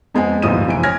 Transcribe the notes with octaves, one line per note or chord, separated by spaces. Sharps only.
F2 G#3 B3 G#5
G1 D#2 A2 F3 D#6 D#7
F1 E3 D7
C#5 G#5 F6 G#6 A#6